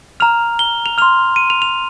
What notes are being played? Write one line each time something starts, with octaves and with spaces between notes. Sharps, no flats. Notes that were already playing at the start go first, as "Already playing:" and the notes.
A#5 F6 F7
G7
F7
C6 F6 F7
D#7
F7
F7